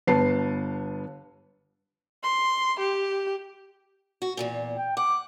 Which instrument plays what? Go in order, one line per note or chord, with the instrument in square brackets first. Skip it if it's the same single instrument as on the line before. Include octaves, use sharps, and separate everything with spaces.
[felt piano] G1 B3 A5 C7
[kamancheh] C6
G4
[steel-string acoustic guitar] F#4
E2 G2 A#2
[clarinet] G5
[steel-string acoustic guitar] F#5 [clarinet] D6